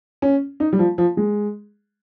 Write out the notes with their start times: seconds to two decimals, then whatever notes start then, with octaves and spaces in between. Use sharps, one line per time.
0.22 C#4
0.60 D#4
0.73 G3
0.79 F3
0.98 F3
1.17 G#3